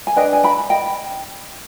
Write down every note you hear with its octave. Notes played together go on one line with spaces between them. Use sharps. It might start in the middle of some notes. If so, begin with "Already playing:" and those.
G#5
D4 G#4 B4 D#5 G5
G#5
G5 B5
D#5 G5